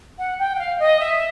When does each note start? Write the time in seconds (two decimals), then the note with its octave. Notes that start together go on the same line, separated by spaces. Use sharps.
0.18 F#5
0.38 G5
0.55 F#5
0.59 F5
0.79 D#5
1.00 E5